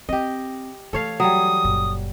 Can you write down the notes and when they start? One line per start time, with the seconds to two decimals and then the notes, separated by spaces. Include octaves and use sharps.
0.09 C4 G4 D#5
0.93 E3 A3 A4 C#5 F5
1.20 F#3 G3 D#6
1.64 F#1 A#2